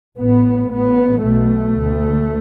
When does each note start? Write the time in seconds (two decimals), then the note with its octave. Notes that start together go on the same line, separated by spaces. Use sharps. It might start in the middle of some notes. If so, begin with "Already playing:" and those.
0.18 A1 A2 B3
0.71 A1 A2 B3
1.24 B1 B2 A3
1.77 D2